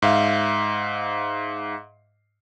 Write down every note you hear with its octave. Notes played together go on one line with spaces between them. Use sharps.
G#2 E5 F5